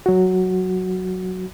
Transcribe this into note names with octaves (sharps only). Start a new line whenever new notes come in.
F#3 F#4